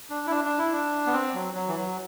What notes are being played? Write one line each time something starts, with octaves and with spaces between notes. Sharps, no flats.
D4
E4
D4
D4
E4
D4
B3
C4
F#3
F#3
E3
F#3